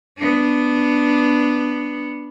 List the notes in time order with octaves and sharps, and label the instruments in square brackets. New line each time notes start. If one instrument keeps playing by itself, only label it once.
[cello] B3 D4